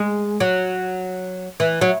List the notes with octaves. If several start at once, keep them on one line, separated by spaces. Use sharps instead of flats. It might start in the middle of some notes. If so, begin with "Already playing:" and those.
Already playing: G#3
F#3
E3
F#3